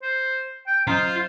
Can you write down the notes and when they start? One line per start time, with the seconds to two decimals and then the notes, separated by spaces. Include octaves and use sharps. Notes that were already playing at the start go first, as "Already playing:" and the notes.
0.02 C5
0.67 G5
0.88 F#3 C#4 F4 C5